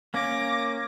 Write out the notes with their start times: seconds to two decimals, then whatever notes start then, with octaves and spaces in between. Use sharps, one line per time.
0.14 A#3 C#4 D6 A#6